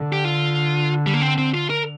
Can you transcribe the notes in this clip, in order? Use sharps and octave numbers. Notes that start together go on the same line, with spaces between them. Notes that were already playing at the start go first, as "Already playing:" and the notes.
Already playing: D3
G4
F4
G3
A#3
C4
C4
F4
A#4